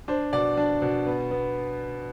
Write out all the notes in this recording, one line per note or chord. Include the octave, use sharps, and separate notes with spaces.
D4 C5
B2 D5
D4
B2
B3
B3